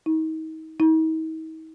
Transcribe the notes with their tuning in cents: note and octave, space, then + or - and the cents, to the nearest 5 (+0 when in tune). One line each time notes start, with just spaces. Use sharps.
D#4 +35
D#4 +45